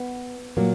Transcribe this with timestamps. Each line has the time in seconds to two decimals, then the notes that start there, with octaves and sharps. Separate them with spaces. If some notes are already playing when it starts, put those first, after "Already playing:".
Already playing: B3
0.57 A#2 F#3 A#3